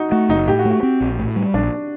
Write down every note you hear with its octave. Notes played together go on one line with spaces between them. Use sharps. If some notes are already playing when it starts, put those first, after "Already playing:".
Already playing: D#4 F#4
A3 F#4
F#1 D#4
A2 G4
F#4
A3
F#4
C4
A#1
A2
G3
A#1 D4